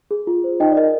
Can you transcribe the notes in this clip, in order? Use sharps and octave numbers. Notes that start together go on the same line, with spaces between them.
G#4
F4
C5
D#4 D#5 G5
D5
A#4 D#5